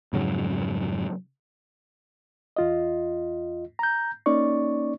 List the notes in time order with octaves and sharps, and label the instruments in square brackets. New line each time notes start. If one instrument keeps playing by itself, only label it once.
[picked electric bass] F2 G#2 C#3 F#3
[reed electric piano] E2 F4 D#5
A#5 G6
A#3 C#4 D#4 D5 C#6